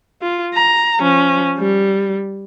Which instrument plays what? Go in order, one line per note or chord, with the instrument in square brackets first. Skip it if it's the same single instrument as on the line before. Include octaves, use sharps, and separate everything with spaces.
[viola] F4
A#5
F3 C#4
G3